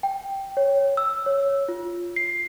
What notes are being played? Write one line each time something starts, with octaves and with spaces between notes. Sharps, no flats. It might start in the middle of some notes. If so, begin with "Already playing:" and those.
G5
C#5
E6
C#5
F4
C7